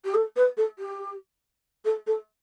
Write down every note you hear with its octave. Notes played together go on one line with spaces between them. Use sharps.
G4
A4
B4
A4
G4
A4
A4